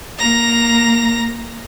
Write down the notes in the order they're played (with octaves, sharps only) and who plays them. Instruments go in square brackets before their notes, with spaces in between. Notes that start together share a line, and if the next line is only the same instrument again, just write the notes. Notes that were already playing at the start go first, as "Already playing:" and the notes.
[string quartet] A#3 A#5 A#6